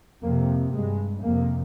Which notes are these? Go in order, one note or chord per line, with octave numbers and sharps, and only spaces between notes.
F2 C3 A#3
G2 G#3
F2 C3 A#3